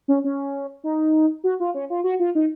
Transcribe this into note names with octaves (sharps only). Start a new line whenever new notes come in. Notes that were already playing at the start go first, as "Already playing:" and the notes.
C#4
C#4
D#4
F#4
F4
C#4
F4
F#4
F4
D#4